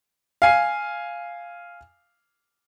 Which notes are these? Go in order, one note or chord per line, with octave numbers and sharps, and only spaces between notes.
F5 G#5 C7